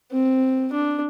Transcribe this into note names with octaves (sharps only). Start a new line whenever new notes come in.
C4
D4